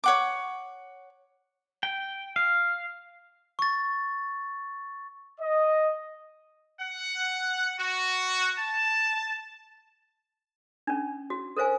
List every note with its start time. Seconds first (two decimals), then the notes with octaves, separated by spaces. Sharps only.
0.04 C#5 F#5 D6
1.83 G5
2.36 F5
3.59 C#6 A6
5.40 D#5
6.80 F#5
7.80 F#4
8.58 A5
10.87 C#4 D4
11.30 F#4
11.56 A4 A#4 C5 F5 G#5